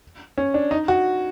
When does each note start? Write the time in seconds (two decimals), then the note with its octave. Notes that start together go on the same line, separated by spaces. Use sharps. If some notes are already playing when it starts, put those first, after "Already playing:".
0.38 C#4
0.54 D4
0.71 D#4
0.88 F#4